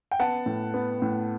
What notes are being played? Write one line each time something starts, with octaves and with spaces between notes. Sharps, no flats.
G5
B3 F#5 A5
A2
B3
A2